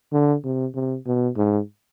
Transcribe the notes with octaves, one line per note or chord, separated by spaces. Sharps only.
D3
C3
C3
B2
G#2